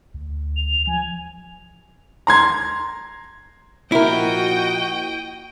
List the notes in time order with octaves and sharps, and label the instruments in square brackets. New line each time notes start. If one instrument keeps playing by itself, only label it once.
[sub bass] D2
[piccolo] F7
[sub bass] F3 [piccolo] G#5
[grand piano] A#5 C6 G#6
[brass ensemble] A#2 F3 F#4 [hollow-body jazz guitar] E4 A#4 [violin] D#5 G5